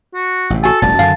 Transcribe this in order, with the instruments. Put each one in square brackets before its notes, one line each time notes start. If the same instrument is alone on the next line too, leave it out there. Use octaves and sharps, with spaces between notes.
[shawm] F#4
[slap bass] A1 C3
[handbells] F#4 G#5 [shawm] A4
[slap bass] E1 A1 G3 [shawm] A5
[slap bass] F#2 D3 D#3 [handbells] F5 G#5 C7